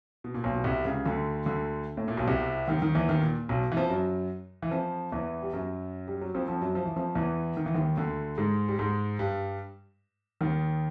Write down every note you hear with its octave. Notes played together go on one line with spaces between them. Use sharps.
B2
A#2
B1 B2
B2
C2 C3
C#2 C#3
D2 D3
D2 D3
A2
A#2
B1 B2
C2 C3
D#2 D#3
D#2 D#3
E2 E3
D#2 D#3
A#2
B1 B2
E3
F2 F3
F#2 F#3
E3
F2 F3
E2 E3
G3
F#2 F#3
G3
F#3
F2 F3
F2 F3
F#2 F#3
F3
E3
F2 F3
E2 E3
D#3
E3
D#2 D#3
D2 D3
G#2 G#3
G3
G#2 G#3
G2 G3
D#2 D#3